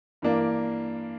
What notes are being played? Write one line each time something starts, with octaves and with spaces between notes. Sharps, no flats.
G2 E3 A#3 D4